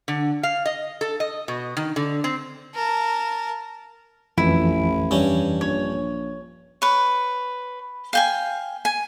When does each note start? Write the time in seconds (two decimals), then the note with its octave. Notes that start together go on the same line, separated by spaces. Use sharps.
0.08 D3
0.43 F5
0.66 D#5
1.01 A4
1.20 D#5
1.48 B2
1.77 D#3
1.96 D3
2.24 C4
2.74 A#4 A5
4.38 A1 F2 E3 E4
5.11 G2 C#4
5.61 A#1 C#5
6.82 B4 C#5
8.13 F5 G5 G#5
8.85 G#5